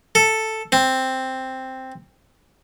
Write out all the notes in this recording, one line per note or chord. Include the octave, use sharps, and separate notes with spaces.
A4
C4